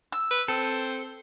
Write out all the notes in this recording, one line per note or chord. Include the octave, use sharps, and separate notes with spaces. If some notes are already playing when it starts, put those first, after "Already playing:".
E6
B4
C4 A4